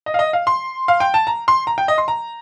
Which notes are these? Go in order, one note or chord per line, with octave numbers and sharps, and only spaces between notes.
D#5
F5
D#5
F5
C6
F5
G5
A5
A#5
C6
A#5
G5
D#5
C6
A#5